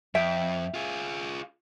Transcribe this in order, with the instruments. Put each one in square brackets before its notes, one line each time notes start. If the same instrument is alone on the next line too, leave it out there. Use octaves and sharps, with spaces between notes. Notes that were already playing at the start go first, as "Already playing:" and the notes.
[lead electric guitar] F2 [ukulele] E5 G5
[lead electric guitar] F4 G#4